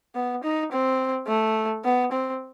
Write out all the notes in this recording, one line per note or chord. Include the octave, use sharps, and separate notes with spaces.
B3
D#4
C4
A3
B3
C4